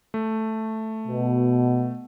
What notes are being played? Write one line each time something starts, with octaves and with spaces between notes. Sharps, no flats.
A3
B2